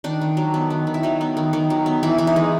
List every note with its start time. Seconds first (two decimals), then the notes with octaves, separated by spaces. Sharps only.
0.04 D#3 D4
0.21 D#3
0.37 F#3
0.54 B3
0.70 D#3
0.87 D#3
0.94 E4
1.03 F#3 D#4
1.21 B3
1.37 D#3
1.53 D#3
1.70 F#3
1.86 B3
2.03 E3 E4
2.18 E3 E4
2.27 D#4
2.36 G#3